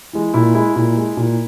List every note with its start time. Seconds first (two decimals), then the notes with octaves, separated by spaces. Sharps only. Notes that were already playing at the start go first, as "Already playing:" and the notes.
0.13 E3 G#3
0.34 A#2 E4
0.54 G#3 E4
0.76 A#2
0.97 G#3
1.17 A#2